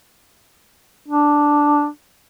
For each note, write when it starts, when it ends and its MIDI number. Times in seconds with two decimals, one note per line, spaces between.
1.08 1.87 62